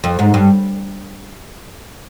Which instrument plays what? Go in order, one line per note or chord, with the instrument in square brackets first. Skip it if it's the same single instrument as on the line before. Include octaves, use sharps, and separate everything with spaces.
[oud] F2
G#2
G2